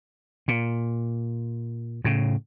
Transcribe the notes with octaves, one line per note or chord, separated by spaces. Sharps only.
A#2
A2 C#3